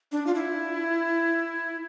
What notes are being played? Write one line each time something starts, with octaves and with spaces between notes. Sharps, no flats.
D4
F4
E4